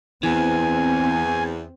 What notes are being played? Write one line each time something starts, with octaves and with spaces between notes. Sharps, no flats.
E2 E3 C4 G#5